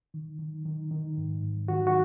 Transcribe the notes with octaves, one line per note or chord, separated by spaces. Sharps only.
D#3
D#3
D#3
D#3
G#2
G#2
D#3 F#4
F#4